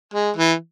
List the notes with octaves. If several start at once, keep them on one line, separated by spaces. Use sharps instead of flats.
G#3
E3